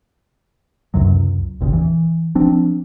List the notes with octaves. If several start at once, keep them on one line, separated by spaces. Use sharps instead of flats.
C#2 F#2 C3 F#3
G#1 D#2 A#2 C#3
E3
F3 C4 D4